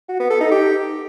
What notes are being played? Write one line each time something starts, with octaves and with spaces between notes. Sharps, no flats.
F#4
B3
A4
D#4
G4